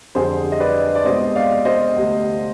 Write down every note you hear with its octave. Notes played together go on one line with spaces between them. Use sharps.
F2 D3 G3 G#4 C5
D#5
B4 D5
D5
C2 B2 G#3 C5 D#5
D5 F5
C5 D#5
D2 C3 G3